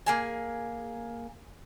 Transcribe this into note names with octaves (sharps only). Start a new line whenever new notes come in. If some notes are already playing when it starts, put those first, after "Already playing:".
A#3 G#4 G#5